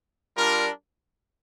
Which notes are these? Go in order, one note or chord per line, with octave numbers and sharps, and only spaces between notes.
G3 D4 F4 A#4